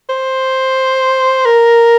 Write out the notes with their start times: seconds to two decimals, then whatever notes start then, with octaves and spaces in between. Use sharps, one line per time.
0.09 C5
1.45 A#4